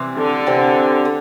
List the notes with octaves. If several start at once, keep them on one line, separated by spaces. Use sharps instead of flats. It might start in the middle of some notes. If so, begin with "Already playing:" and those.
Already playing: C3 E3 G3 C4
D3
C3 E3 G3 C4
D3